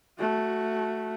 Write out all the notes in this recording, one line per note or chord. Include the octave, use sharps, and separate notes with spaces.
A3 F#4